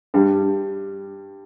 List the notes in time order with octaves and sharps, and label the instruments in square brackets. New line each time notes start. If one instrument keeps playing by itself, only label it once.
[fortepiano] G2 G3